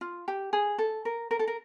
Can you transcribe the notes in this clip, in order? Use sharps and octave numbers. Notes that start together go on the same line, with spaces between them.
F4
G4
G#4
A4
A#4
A#4
A4
A#4